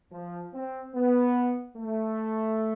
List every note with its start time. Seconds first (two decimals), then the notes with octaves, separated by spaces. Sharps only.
0.11 F3
0.53 C4
0.94 B3
1.76 A3